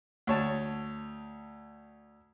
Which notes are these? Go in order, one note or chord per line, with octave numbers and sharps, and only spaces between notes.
D2 C#5 A5